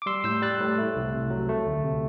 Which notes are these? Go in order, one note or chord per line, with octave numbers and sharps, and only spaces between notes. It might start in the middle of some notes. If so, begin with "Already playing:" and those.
D6
G3 C6 E6
A2 E6 G6
G3 F#6 A6
A2
A3
C2
C3
F#3
A3
D2
C3